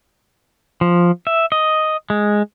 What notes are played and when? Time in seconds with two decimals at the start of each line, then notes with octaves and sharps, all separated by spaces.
0.81 F3
1.27 E5
1.52 D#5
2.10 G#3